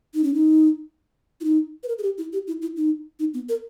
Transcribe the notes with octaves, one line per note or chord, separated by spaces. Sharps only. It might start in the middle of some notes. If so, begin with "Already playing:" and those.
D#4
C#4
D#4
E4
D#4
B4
A#4
G#4
G4
E4
G4
E4
E4
D#4
D#4
B3
A#4